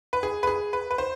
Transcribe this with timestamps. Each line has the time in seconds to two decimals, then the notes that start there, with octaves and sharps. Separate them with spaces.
0.13 B4
0.23 G#4
0.43 B4
0.47 G#4
0.73 B4
0.91 B4
0.98 C5